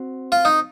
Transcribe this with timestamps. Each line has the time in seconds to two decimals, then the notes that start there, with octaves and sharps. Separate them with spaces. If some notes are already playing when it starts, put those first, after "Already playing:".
Already playing: C4 F#4
0.32 F4
0.45 D#4